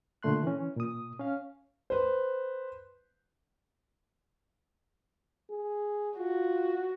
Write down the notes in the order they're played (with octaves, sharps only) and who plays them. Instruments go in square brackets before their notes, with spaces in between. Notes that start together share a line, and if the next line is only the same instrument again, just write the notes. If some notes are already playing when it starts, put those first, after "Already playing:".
[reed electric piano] A#2 D3 A3 C6 F#6
E3 C#4
A#2 D#6
C#4 F5
[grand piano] B4 C5
[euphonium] G#4
[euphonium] F4 [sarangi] F#4